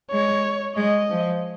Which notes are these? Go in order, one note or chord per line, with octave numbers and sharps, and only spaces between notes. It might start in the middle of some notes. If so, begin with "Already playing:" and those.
G#3 C#5
G#3 D#5
F3